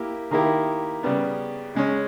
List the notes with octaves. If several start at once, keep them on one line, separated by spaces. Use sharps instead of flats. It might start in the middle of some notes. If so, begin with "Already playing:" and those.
Already playing: A#3 E4 G4
D#3 A#3 E4 G4
C#3 G3 B3
C#3 G#3 C#4